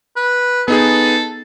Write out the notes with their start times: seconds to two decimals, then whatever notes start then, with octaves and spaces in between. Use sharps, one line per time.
0.16 B4
0.68 B3 D#4 G#4 A4